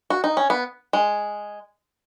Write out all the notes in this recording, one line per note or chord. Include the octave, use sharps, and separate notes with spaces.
F#4
D#4
C#4
B3
G#3